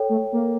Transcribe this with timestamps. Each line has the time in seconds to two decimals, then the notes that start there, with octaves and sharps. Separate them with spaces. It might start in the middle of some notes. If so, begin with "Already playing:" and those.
Already playing: A4 C#5 G5
0.09 A3
0.32 A#3